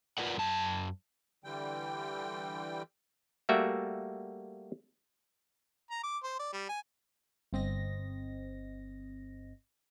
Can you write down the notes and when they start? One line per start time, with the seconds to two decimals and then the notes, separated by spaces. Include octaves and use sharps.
0.18 F4 A#4 B4 D5 F#5
0.37 F#2 A5
1.44 D3 E3 G3 G5
3.49 G3 A3 A#3 F#4 E5 F#5
5.91 A#5
6.03 D6
6.23 C5
6.39 D5
6.53 G3
6.69 G#5
7.53 G1 C4 D#5 A#6